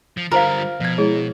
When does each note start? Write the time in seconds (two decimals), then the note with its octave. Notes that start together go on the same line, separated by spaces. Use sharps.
0.17 F3
0.32 D3 G3 F4 A#4 C5 F5
0.80 B2 F3 G#6
0.98 G#3 E4 G#4 C#5